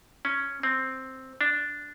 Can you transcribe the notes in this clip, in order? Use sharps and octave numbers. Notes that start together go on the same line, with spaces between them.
C#4
C4
D4